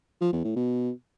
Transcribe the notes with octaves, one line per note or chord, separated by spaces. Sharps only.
F3
E2
A2
B2